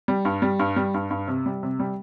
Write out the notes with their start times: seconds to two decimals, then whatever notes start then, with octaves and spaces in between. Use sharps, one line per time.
0.08 G3
0.25 G2
0.42 G3
0.59 G2
0.76 G3
0.94 G2
1.11 G2
1.28 C3
1.46 G3
1.63 C3
1.79 G3